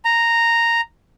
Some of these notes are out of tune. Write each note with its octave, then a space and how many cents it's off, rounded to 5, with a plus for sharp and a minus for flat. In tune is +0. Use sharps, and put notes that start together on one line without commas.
A#5 -5